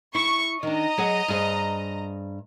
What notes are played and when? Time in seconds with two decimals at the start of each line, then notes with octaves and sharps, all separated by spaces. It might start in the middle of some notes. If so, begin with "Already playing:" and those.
0.15 E4 C#6
0.63 D#3 D4 D#5 A#5
0.98 F#3 G#4 F#5
1.28 G2 G#4 C5